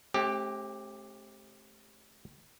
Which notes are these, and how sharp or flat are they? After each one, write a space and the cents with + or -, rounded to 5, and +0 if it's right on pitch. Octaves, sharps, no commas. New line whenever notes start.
A3 -35 C4 +35 G4 +0